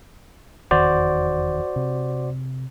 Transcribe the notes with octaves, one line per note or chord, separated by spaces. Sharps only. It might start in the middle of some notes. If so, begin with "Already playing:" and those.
F1 E2 D#3 F#4 C5 D5
C3